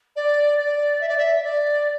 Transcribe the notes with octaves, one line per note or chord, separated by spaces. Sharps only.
D5
D5
E5
D5
E5
E5
D5